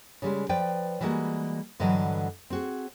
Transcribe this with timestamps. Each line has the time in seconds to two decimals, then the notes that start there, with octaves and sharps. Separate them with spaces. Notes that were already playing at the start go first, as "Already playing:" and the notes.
0.22 C#3 G3 G#3
0.49 F3 B4 D5 G5
1.01 E3 G3 G#3 A#3 F#4
1.80 G2 D3 E3 F#3 D#5
2.50 C4 F#4 G#4